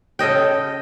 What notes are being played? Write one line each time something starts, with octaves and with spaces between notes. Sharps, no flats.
C#3 A4 D#5 G5